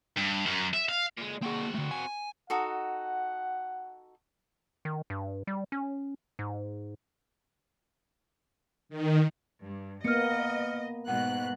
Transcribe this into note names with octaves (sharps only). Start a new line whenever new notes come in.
G2
F#2
E5
F5
A#2 G#3
A#3 C4 F#4 G#4
D3 A3
G#5
D#4 F#4 A4 F#5
D#3
G2
G3
C#4
G#2
D#3
G2
A#3 B3 D#5 F6 C#7
G#2 B2 F#5 F#6